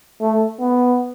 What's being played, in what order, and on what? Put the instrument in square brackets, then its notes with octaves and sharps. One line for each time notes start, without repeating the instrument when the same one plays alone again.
[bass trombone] A3
B3